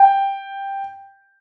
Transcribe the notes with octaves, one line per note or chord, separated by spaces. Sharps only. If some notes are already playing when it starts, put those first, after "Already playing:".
Already playing: G5